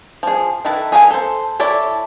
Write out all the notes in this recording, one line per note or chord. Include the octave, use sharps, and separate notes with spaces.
F3 G#4
D#3 E4 A4 B4
G#4 A#4 F5 G#5
A4 C5
E4 A4 C#5 D5